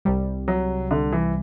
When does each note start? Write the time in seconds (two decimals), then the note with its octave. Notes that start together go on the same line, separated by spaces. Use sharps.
0.05 C2 C3 G3
0.48 F#3
0.91 D3
1.12 E3